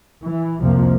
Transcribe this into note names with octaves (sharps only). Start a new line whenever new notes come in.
E3
C2 F2 C3 F3 A#3